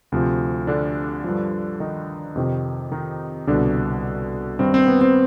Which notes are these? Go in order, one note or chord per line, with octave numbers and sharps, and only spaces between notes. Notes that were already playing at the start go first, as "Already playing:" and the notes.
D2 C3 F3
D3 D4
G2 F3
D#3 D#4
F2 C3 D#3
D#3 D#4
C2 B2 D3 D4
G2 D#3 C4
C4
B3
C4